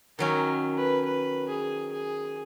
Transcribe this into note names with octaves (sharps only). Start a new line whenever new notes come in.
D#3 F#3 C#4 A#4
B4
B4
G#4
G#4